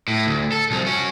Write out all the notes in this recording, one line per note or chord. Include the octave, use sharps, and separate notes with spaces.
A2
D2
A4
C2 F3
C#4 F#4